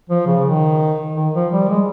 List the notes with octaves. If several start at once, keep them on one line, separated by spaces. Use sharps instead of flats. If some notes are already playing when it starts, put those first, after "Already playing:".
F3
C#3
D#3
D#3
F3
G3
G#3